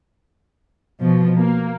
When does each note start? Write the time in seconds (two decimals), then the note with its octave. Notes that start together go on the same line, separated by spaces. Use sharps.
1.00 B2 F3
1.38 A#3